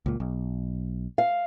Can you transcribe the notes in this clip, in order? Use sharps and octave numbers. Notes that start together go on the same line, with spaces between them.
C#2 A#2
B1
F5